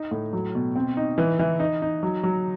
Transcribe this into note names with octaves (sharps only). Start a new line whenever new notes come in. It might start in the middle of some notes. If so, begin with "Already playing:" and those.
Already playing: D#4
A2
F#3
B2
C4
D#4
E3
E3
D#4
D#4
F#3
F#3